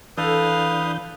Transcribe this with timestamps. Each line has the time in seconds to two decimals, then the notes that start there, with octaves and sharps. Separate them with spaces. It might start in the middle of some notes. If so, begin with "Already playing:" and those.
0.17 E3 D4 A4 B4 F5 D#6 G6